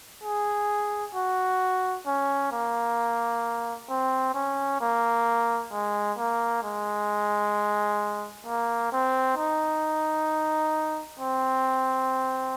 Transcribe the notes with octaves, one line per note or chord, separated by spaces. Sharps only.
G#4
F#4
C#4
A#3
C4
C#4
A#3
G#3
A#3
G#3
A#3
C4
D#4
C4